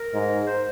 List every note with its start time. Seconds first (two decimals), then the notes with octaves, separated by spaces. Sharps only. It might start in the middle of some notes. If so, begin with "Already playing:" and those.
Already playing: A#4
0.13 G#2
0.47 C5